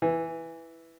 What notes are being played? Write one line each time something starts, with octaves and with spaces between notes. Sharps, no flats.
E3